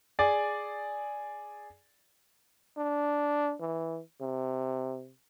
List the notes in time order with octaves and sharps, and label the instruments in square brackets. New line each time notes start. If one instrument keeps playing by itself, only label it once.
[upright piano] G#4 D5
[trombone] D4
E3
C3